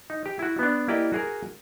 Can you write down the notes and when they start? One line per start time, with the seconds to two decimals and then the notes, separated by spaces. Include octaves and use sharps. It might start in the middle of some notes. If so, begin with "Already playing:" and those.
0.10 D#4
0.26 G4
0.39 E4 F#4
0.59 B3 D4
0.88 A#3 E4 G4 D5 D#5
1.12 F#4 G#4 A#4